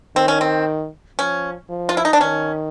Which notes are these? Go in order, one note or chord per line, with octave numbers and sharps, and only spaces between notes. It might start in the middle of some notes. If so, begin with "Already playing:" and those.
D#3 C4
C#4
C4
F3 C#4
F3
F4
E4
D#4
D4
D#3 C#4